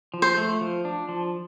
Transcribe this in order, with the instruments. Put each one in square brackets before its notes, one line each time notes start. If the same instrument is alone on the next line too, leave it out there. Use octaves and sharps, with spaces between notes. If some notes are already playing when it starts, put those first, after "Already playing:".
[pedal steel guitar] F3
[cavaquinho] C5
[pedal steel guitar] A3
F3
D4
F3